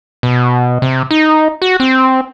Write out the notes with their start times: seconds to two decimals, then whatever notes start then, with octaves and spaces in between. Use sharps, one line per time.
0.23 B2
0.82 C3
1.11 D#4
1.62 F#4
1.80 C4